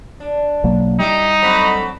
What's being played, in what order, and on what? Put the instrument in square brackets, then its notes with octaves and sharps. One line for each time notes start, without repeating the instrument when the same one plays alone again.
[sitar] D4
[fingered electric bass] B1 F#3 A#3
[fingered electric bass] G3 [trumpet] D#4 [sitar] E4 G4
[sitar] A2 F#3 C4 [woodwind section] D3 B5